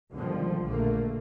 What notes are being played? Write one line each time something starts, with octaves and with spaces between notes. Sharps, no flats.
C#2 B2 D3 D#3 F3 G3
A#1 D3 A3 A#3